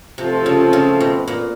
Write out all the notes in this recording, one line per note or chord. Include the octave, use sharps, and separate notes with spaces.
C3 F3 A3 C4 F4
C#3
C#3
B2
A#2